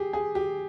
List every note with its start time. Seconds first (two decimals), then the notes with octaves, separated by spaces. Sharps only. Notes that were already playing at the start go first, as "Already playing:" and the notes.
Already playing: G4 G#4
0.13 G#4
0.35 G4